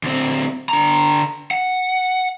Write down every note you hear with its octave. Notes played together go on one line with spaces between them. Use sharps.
D2 C4
D3 A#5
F#5